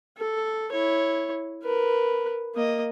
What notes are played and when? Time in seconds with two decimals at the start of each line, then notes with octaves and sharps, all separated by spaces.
0.17 A4
0.71 E4 C#5
1.63 A#4 B4
2.55 A#3 D#5